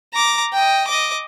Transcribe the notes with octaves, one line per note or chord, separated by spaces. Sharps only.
A#5 D6
D#5 G5
D#5 D6